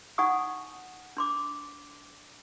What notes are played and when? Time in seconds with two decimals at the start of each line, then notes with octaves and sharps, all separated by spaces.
0.18 D#4 F#5 G#5 B5 C#6 D#6
1.17 D4 C6 D6